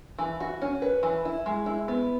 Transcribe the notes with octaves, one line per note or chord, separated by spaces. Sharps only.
E3
F#4
C#4
B4
E3
E4
G#3
E4
B3